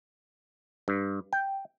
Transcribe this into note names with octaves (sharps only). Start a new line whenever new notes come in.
G2
G5